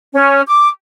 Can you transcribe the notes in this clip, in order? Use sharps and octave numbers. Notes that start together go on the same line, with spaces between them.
C#4
D6